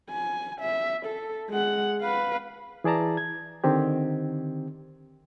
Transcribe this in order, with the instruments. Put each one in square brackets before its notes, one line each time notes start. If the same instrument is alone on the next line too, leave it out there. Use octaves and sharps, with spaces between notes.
[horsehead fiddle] G#5
E5
A4
G#3 F#5
B4 F5
[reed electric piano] E3 G#4 D5 A5 A#5
G#6
D3 D#3 C4 G4